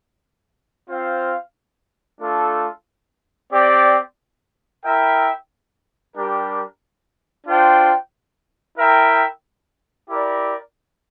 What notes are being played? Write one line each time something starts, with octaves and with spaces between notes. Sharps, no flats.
C4 F4 C5 F5
A3 D4 F4 A4
C4 G4 D5
E4 A#4 E5 G5
G3 D4 G4 A#4
D4 F4 C5 G5
E4 A#4 E5 G5
E4 G4 A#4 D5